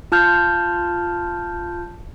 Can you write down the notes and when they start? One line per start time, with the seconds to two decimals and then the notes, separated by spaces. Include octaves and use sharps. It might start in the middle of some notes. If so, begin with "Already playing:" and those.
0.12 F4 A5 F6 G6